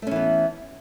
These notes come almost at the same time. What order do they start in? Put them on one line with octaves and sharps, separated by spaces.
A3 C#4 E3 B3